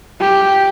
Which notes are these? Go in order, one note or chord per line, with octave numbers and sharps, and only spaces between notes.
G4